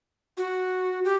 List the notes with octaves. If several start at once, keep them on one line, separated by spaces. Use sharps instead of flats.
F#4
G4